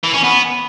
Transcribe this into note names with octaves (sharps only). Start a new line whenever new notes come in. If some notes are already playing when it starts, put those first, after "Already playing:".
E3
C#4
B3